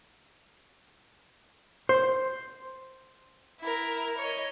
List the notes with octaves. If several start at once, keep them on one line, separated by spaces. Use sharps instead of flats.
C5
E4 A#4
C#5 D#5